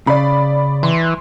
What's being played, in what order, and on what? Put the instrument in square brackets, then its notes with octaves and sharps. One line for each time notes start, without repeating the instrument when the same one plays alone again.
[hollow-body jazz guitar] C#3 [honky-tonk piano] D5 B5
[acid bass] E3 [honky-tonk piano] C6